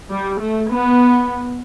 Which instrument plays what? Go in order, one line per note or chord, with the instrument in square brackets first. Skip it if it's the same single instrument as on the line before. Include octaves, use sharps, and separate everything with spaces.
[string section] G3
A3
B3